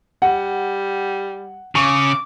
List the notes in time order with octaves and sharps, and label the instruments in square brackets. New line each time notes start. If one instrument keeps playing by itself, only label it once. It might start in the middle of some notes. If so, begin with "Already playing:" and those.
[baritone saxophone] G3 [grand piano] F#5
[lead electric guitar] C#3 [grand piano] C#6 [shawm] D6